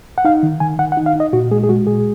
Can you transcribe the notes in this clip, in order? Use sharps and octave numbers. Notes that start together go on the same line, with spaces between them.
F#5
D#4 F5
D#3
D#3 G#5
D#3 F#5
F#5
D#4
F5
D#4 D#5
A#2 F#4
G#3 G#4
G#4
G#3 F#4
A#2 G#4